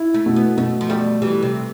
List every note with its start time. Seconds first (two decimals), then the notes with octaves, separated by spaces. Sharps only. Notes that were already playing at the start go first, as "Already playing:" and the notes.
Already playing: E4
0.14 A3
0.26 B2
0.36 B3
0.57 B2 A3
0.81 F3
0.89 G3 A3
1.22 E3 G3
1.42 C3